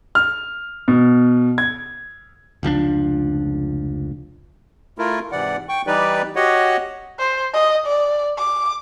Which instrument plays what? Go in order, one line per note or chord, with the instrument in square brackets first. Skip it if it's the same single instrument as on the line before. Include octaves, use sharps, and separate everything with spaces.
[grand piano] F6
B2
G#6
[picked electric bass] F1 C#2 F3 D4
[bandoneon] A3 E4 F4 A#4
G#2 C3 E3 D5 F#5
G5 C#6
E3 G3 D#4 G4 B4 D5
F#4 G4 C#5 D#5 F#5
[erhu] C5
D#5
D5
D6